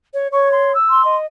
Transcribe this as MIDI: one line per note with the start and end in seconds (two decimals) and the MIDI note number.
0.14 0.27 73
0.32 0.73 73
0.32 0.51 85
0.51 0.72 84
0.74 1.04 88
0.90 1.16 84
1.04 1.26 75